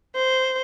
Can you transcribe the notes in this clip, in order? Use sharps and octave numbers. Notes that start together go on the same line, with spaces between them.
C5